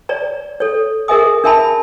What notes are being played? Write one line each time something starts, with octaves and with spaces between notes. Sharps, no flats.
C#5 D5 A#5
A4 C#5
G#4 A#4 D#5 E5 G#5 D#6
D4 A#4 E5 G#5 A5 B5